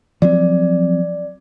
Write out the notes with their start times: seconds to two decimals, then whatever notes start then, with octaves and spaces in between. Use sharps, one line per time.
0.22 F3 F#3 C4 D5